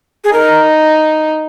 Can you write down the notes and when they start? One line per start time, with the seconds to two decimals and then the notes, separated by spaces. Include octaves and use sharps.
0.24 G#4
0.33 D#4 A#4